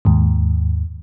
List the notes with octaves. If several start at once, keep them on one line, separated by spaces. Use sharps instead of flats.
D#2 G#2